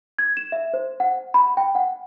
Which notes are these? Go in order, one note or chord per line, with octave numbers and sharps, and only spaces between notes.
G#6
E7
E5
C5
F#5
B5
G5
F#5